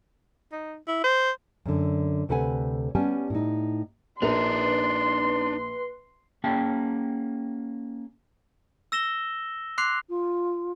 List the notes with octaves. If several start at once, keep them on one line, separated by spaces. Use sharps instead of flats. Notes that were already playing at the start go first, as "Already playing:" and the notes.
D#4
E4
C5
F#2 D3
D2 C3 A4 B4 F#5 G#5
G3 B3 C#4 G#5 A5
A2 D#4
A#1 D4 D#4 A#4 B4 C6 F7
A#3 C#4 G#4 G5 A5
E6 A#6 E7 G7
C6 D6 F#6 C7 F7
F4